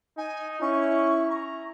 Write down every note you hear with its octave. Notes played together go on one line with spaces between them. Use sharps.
D#4 G#5
C#4 E4 C#6
A#5